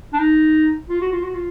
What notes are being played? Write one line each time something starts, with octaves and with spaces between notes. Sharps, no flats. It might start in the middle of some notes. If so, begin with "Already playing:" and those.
D4
D#4
F4
F#4
F4
F#4
F4